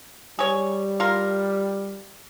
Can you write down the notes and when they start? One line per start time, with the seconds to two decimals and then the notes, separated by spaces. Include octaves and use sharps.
0.39 G3 G#4 C#5
1.00 F4 A#4